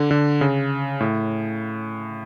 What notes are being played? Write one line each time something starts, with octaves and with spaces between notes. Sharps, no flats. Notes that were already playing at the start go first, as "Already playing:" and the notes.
Already playing: D3
D3
C#3
A2